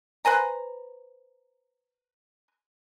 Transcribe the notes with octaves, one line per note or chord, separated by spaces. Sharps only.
B4 C5 G#5 A#5